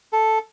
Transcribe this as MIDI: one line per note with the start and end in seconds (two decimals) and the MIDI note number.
0.13 0.39 69